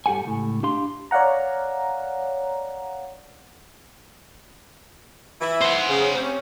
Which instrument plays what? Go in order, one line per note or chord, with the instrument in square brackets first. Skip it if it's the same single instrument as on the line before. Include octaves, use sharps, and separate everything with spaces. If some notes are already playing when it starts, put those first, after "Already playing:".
[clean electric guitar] G2 G4 A4 F#5 G#5
C#2 A2
D4 G4 F5 C6
[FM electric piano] C#5 D5 F5 F#5 A#5
[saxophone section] E3 E4
[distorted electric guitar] C5 F#5
[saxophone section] C#3
C3 C#4